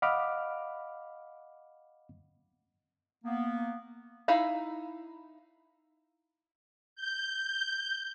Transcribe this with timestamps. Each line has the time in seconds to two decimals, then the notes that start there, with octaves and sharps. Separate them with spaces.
0.02 D#5 F5 F#5 B5 D6 F6
3.24 A#3 B3
4.28 D#4 E4 F5 B5
6.95 G6